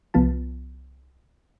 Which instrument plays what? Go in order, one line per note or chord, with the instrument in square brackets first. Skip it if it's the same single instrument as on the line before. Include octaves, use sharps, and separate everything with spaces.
[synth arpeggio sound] C2 F3 B3 F4 A5